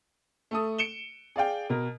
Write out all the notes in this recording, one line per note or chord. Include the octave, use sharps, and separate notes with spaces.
A3 A4 D#6
C#7 D7 E7 G7
G#4 D5 F5 G5
B2 A#4